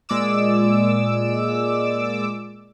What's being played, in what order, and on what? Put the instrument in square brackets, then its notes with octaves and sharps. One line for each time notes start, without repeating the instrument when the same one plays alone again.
[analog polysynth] A#2 G#3 D5 D6 E6